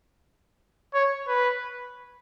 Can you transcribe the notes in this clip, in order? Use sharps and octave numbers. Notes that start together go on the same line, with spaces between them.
C#5
B4